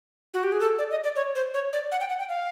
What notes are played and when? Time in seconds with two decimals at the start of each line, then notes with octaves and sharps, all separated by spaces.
0.34 F#4
0.43 G4
0.52 G#4
0.60 A4
0.78 D5
0.91 D#5
1.04 D5
1.16 C#5
1.35 C5
1.54 C#5
1.73 D5
1.92 F#5
2.00 G5
2.09 F#5
2.19 G5
2.29 F5